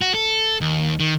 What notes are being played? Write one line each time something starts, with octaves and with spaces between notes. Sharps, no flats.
F#4
A4
D#2
D#3